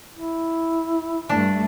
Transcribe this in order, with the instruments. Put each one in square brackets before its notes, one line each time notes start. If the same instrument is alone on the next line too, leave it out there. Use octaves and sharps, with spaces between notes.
[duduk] E4
[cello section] G2 A3 [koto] D4